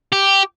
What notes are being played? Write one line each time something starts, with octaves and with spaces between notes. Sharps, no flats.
G4